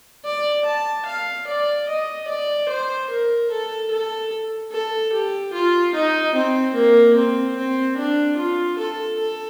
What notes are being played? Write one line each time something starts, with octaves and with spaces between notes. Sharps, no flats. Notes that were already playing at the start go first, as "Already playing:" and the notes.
D5
A5
F5
D5
D#5
D5
C5
A#4
A4
A4
A4
G4
F4
D#4
C4
A#3
C4
C4
D4
F4
A4
A4